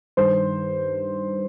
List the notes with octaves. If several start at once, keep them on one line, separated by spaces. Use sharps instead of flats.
G2 D#3 C5